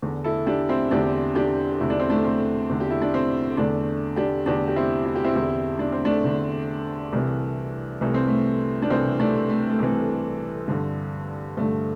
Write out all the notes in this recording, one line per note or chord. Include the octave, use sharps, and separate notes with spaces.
E2 D3
E4 A4
D4 G4
C4 E4
E2 D3 D4 G4
D4 G4
E2 D3 E4
D4
C4
A3 D4
C4
E2 D3
G4
E4
D4
C4
E2 D3 A3 D4
D4 G4
E2 D3 D4 G4
G4
C4 E4
E4
G4
C4 E4
E2 D3 C4 E4
D4
C4
A3 D4
E2 D3
C2 C3 E3
C2 C3 E3 A3
C4
A3
D4
C2 C3 E3 C4
A3 D4
A3
A3
C2 C3 E3 C4
G2 D3
G2 D3 A3